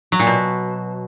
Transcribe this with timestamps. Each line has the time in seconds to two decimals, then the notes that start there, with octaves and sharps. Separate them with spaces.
0.12 F#3
0.20 A#2
0.27 B2